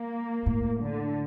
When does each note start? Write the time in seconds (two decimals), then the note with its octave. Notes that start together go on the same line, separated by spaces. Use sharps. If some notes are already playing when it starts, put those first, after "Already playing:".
Already playing: A#3
0.46 A2
0.82 D3